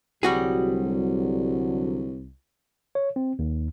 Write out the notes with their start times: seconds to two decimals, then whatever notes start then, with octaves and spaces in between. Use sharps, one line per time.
0.23 C2 D3 F#3 G3 F#4 G#4
2.95 C#5
3.16 C4
3.39 D#2